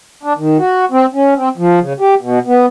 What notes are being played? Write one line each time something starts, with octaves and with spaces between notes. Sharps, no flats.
D4
D#3
F#4
C4
C#4
C4
F3
C#3
G4
B2
B3